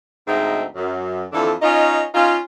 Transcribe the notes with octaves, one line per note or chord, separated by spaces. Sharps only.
D2 G#2 C4 D#4 E5
F#2
F2 D3 E3 D4 A4
C#4 D#4 F4 C#5 D#5
C#4 D#4 F4